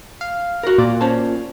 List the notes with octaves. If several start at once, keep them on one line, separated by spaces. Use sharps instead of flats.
F5
F#4 A#4
A#2 D5
C#4 C5 A5